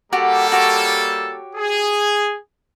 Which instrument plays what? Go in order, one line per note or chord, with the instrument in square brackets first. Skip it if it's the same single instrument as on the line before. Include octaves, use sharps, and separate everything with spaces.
[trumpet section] G3 A#3 A4 [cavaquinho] F#4 G4 F#5
[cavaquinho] F#4 G4 C#5
[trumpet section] G#4